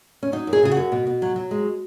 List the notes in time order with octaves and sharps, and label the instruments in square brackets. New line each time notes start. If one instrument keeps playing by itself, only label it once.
[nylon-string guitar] C#4
F#3 D#4
F#2
G#4
C#3 G#4
F#4
F#2
B2
B2
F#3
F#3
G#3